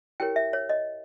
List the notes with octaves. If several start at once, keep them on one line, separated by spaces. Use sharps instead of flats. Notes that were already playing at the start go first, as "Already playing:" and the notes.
E4 G4 A#4 C#5 G5
E5
C#5
D#5